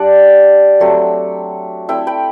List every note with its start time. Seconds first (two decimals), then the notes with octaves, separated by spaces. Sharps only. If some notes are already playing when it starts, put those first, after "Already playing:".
Already playing: G3 D4 D5 F#5
0.80 F#3 A3 C4
1.89 A3 C4 E4 E5 G5
2.07 G5 B5